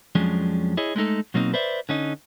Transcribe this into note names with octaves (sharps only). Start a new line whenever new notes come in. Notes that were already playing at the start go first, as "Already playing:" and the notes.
F2 F3 F#3 G#3 C#4 D4
E4 G#4 C#5 D#5
G#3 A3 D#4 A4
B2 F#3 A#3 C4 D#4
B4 C5 D5 E5
D3 C#4 D#4